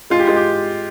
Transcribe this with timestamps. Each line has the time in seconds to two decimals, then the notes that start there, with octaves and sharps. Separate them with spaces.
0.10 G#3 F4
0.19 G4
0.27 G#3 F4
0.36 G4